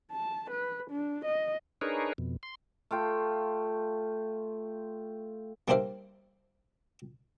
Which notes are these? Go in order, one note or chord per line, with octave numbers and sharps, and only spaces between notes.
A5
B4
D4
D#5
D4 D#4 G#4 A#4 B4 C#5
F2 B2
C6
A3 F4 G5
G3 A#3 D4 C5 E5 F5